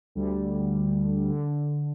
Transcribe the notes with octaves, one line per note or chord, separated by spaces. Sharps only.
D2 D3 G3
D3